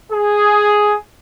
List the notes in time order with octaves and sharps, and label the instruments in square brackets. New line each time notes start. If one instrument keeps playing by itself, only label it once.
[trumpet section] G#4